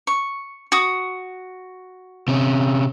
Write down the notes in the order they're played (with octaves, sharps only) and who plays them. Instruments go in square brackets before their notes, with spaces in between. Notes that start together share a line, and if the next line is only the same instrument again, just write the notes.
[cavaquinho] C#6
F#4 D#6
[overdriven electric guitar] C3 C#4